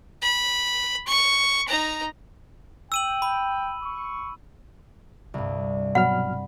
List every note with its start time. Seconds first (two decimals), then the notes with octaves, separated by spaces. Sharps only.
0.22 B5
1.07 C#6
1.68 D#4 A#5
2.92 G5 E6 D#7 F#7
3.22 B5
3.83 C#6
5.34 C2 G2
5.95 B2 F#3 F#5 B5 F6